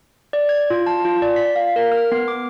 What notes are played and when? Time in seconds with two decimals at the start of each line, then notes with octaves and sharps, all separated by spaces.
0.33 D5
0.49 G#6
0.70 F4
0.87 A5
1.05 F4
1.22 D5
1.36 B6
1.56 F5
1.76 A#4
1.92 F6
2.12 B3
2.28 D6